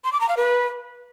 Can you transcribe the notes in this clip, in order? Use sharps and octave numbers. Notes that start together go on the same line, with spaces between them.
C6
D6
A#5
F5
B4